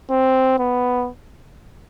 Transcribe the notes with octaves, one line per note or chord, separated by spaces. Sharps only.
C4
B3